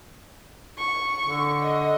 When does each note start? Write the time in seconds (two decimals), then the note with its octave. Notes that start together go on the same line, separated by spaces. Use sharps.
0.78 C#6
1.25 D3
1.63 D#5